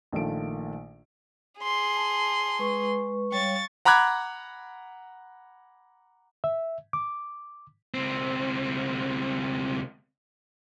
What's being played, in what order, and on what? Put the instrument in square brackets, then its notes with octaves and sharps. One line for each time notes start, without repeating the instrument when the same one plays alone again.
[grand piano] A#1 D#3 A3 F4 A4 D7
[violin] G#4 C6
[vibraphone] A5
G#3 B4 C#6
[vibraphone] G3 C#5 F5 [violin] C#6 A6
[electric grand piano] F#5 A#5 B5 D6 F#6 G#6
[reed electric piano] E5
D6
[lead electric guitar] C#2 C4